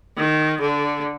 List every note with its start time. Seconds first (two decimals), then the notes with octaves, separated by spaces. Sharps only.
0.17 D#3
0.61 D3